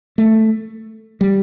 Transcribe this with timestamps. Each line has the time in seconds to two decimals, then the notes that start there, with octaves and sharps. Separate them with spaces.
0.18 A3
1.21 G3